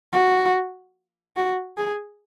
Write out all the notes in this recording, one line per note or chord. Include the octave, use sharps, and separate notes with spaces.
F#4
F#4
G#4